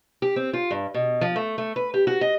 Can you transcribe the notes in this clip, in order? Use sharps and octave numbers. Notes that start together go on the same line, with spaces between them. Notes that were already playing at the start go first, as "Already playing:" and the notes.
G4
C4
F4
G2
B2
F3
A3
A3
B4
G4
F#4
D#5